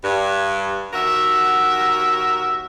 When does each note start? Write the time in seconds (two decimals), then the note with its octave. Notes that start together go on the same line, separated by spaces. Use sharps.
0.03 G2
0.93 D#2 F#4 A#4 E5